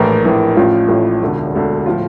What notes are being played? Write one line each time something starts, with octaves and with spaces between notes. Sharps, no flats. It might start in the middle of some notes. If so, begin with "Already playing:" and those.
Already playing: A#1 A2 E3 A#4
A#1 A2 E3
A1 A2 F3 F4
A1 A2 F3
E1 D2 D3
E1 D2 D3
A2 F3 F4